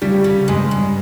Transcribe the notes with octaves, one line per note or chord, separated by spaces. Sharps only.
C#3 G3
C#3
G2 G#3
G2